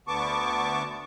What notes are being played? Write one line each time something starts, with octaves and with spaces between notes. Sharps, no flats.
D2 D3 B3 A5 C#6 D6